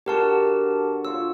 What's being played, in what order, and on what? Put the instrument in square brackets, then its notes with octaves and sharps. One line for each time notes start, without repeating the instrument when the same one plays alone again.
[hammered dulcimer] D3 F#4 A4 [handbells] G4 A#4 A5
[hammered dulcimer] F4 C#5 [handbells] E6